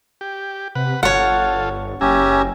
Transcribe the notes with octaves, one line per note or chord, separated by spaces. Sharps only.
G4
C3 B4 F#5
G1 F4 A4 C#5 F#5
F#1 C#4 G4 E5 G#5 A#5